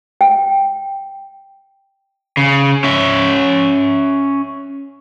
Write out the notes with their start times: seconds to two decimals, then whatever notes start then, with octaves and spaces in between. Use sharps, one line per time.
0.21 G5
2.37 C#3
2.84 C#4 E5